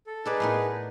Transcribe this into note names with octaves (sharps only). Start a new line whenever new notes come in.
A4
D#4 G#4 A4 B4 D5 A5
A2 B3 A#4